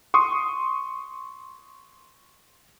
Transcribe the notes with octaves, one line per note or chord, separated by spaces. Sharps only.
C6 C#6 D#6